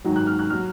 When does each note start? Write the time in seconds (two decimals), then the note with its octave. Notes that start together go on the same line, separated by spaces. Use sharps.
0.04 G#2 D#3 F#3
0.16 F#6
0.27 F6
0.39 F#6
0.50 F#3 F6